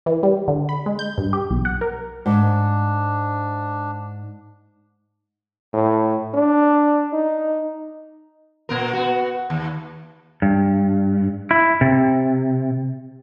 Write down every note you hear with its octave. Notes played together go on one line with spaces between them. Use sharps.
E3
G3
D3
B5
G#3
G6
G2
G4
B1
F#5
A#4
G#2 D4
A2
D4
D#4
A#2 B3 A#4
B3 F#4
D#2
G2
E4
C3